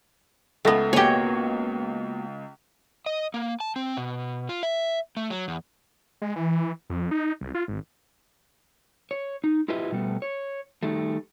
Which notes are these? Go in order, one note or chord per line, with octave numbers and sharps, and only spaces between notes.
C#2 A3 B3 A#6
A#3 B3 F#4 G4 C#5 G5 G#5
D#5
A#3
A5
C4
B2
F4
E5
A3
F#3
E2
G#3
E3
F2
D#4
C2
F4
G#1
C#5
D#4
E4 F4 G4 B4 D#5 E5
B2 G3 A3 B3
C#5
D#3 G3 A3